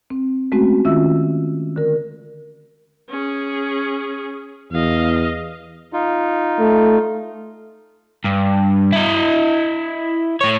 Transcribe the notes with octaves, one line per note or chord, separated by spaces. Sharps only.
C4
G#3 A3 C4 C#4 F#4
D#3 C#4 F4 E5 E6
D3 A#4
C#4 G#4
E2 D#5 F5
D#4 F4
A3
G2
E4 D#5
A2 C#5